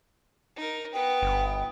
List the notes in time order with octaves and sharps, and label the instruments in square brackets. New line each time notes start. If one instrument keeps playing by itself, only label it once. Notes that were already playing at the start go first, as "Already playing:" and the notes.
[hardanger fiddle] D#4 A#4
[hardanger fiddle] B3 B4 [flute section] G5 B5 D#6
[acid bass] G1